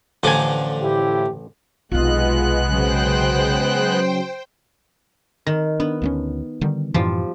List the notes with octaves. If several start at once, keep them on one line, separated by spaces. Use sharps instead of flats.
A1 D3 F3 D4 G#5
A2 E4 G4
B1 C3 G#3 B3 F4 D#5 F#6
C#3 F#3 C5 G5
D#3
B3 D4
D2 A#3 C#4
D3 D#3 G3
F#2 A2 E3 F3 G3